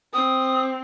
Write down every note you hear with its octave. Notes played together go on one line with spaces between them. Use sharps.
C4 D#6